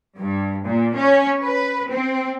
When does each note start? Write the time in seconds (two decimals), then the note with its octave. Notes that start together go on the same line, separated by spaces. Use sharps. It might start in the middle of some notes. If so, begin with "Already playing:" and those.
0.18 G2
0.66 A#2
0.96 C#4
1.43 B4
1.90 C4